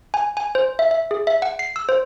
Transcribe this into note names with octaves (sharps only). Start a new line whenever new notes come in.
G#5
G#5
C5
E5
E5
G#4
E5
F#5
C7
E6
C5